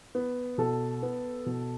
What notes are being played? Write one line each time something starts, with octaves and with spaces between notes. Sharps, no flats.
B3
B2 A4
B3
B2